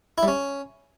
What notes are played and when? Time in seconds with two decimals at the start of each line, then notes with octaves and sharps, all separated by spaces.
0.18 E4
0.23 G3
0.28 C#4